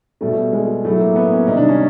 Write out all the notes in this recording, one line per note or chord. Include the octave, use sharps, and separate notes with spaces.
B2 G3 A3
G#3
A2 F#3 A3
A#3
B3
C#4
C3 D#3 G3 D#4
D4
C#4